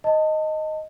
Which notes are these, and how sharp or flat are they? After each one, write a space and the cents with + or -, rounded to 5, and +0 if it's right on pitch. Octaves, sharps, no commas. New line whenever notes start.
D#5 +0 A5 +25